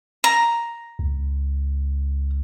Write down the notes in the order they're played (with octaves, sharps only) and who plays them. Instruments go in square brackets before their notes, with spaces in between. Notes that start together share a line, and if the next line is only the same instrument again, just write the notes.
[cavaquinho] A#5
[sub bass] C#2